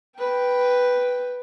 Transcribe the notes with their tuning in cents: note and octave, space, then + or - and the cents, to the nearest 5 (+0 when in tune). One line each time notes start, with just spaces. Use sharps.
B4 +0 G5 +0